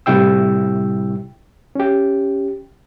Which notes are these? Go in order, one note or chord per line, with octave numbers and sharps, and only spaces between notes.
A2 C3 G3 E4 G5 E6
C#4 G4